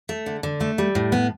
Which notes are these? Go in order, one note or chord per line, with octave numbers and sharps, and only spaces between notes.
A3
D3
D3
A3
G3
A2
B3